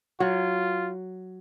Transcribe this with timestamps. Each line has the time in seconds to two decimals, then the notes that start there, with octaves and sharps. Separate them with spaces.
0.20 F#3 F4